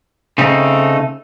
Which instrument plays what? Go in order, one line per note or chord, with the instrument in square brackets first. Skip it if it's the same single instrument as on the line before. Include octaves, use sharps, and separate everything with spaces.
[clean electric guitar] C#3 C4 D#4 [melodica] A3